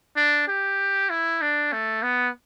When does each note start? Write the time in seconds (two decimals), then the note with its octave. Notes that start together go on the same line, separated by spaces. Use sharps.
0.16 D4
0.48 G4
1.10 E4
1.42 D4
1.72 A3
2.03 B3